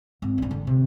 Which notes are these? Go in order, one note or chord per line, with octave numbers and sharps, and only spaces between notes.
G#1
C3 D4
D3
C3